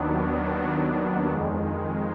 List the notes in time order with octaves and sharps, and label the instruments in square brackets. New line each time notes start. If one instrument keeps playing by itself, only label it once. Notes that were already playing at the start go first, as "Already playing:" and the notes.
Already playing: [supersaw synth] D#2 D#3 F#3 B3 D4
F2 D#3 G#3